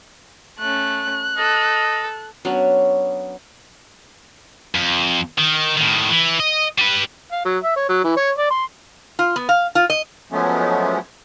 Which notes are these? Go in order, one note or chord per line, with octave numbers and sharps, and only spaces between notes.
A3 C#4 F#6
A4 D#5
F#3 B3 C#4 D4
F2
D#3
A2 D#3
E3
D#5
G3 B4
F5
F#3
E5
C#5
F#3
E3
C#5
D5
C6
F4
B3
F5
F4
D#5
F3 F#3 G#3 A3 B3 C#4